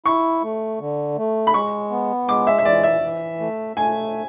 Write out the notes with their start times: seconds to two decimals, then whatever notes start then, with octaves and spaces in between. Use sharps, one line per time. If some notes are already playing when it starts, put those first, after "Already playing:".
0.06 E4 C#6
0.43 A3
0.80 D3
1.17 A3
1.47 B5
1.54 G#3 C#6
1.91 B3
2.28 G#3 D6
2.47 E5
2.58 E5
2.65 E3 D5
2.83 E5
3.02 E3
3.40 A3
3.77 A3 G#5